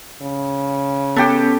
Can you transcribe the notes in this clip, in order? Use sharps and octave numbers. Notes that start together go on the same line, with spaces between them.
C#3
B3 C#4 G4 A4